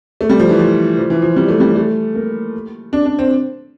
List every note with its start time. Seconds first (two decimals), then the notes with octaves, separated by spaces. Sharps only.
0.21 A3
0.30 G3
0.40 F3
0.49 E3
0.59 F3
0.98 F3
1.10 E3
1.22 F3
1.36 G3
1.48 A3
1.60 G3
1.76 A3
2.15 A#3
2.93 D4
3.06 D4
3.19 C4